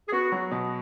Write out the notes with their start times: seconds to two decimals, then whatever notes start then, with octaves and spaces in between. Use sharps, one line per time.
0.08 G#4
0.12 B3 F#4
0.32 F#3
0.51 B2